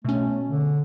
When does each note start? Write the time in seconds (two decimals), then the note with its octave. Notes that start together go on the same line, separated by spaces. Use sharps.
0.05 B2 A3 C#4
0.49 D3